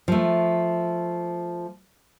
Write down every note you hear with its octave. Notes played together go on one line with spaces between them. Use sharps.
F3 A3